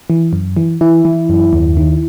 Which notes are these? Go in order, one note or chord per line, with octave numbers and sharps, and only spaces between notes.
E3
F#2
E3
E3 E4
E3
F#2
D#2
D#3